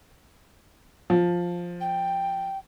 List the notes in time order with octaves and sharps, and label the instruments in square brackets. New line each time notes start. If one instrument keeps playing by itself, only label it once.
[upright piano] F3
[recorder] G5